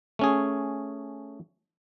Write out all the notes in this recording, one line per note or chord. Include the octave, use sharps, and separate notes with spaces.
A3 C#4 G#4